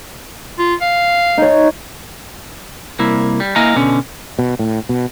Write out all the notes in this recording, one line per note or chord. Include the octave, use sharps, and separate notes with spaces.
F4
F5
D#4 C#5
C2 A#3 E4
G3
A#3 E4 D#5 F5 G#5 A#5
B2 D3 C#4
B2
A2
B2